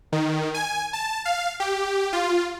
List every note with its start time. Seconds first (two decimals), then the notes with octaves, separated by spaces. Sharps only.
0.12 D#3
0.54 G#5
0.93 A5
1.25 F5
1.60 G4
2.13 F4